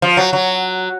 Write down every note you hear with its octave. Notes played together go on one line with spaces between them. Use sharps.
F3
F#3
F#3